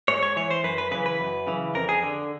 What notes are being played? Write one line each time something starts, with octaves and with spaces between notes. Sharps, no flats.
G#2 C#5
C#5
E3 C#5
C5
F#2 B4
B4
C#3 E3 B4
B4
F#2
C#3 E3
F2 A#4
G#4
D3